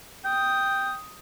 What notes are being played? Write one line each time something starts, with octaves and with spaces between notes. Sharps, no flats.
G5 D#6